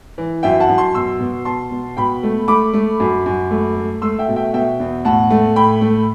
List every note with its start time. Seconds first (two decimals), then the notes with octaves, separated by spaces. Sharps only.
0.18 E3
0.43 F#2 E5 G5
0.60 F#5 A5
0.69 F#2
0.78 A5 C6
0.94 B2 C6 E6
1.20 B2
1.45 B2 A5 C6
1.71 B2
1.97 B2 G5 B5
2.23 A3
2.48 A3 B5 D6
2.73 A3
3.00 F#2
3.26 F#2
3.51 A3
3.77 A3
4.02 A3 C6 E6
4.19 E5 G5
4.28 B2
4.36 E5 G5
4.53 B2 E5 G5
4.80 E2
5.05 A2 F#5 A5
5.30 A3
5.56 A2 G5 B5
5.81 A3